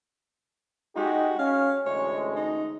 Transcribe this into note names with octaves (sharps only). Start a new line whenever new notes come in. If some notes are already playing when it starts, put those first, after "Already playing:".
G#3 D#4 F#4 G4
C#4 F5
A1 D2 G#3 C#5
D#4